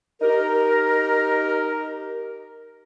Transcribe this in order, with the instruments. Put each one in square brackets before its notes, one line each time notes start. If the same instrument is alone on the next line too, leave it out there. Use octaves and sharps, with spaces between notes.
[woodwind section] D#4 G4 A#4